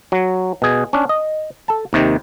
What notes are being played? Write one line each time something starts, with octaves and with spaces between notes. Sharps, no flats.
F#3
B2 G#4
C#4 D4
D#5
A4 A5
D#2 C3 D#3